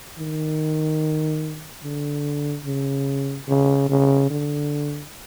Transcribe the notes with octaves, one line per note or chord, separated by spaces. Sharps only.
D#3
D3
C#3
C#3
C#3
D3